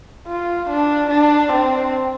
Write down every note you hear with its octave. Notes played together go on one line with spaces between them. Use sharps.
F4
D4
D4
C4